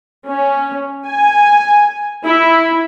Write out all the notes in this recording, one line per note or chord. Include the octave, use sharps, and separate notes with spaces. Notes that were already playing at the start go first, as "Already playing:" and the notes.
C#4
G#5
E4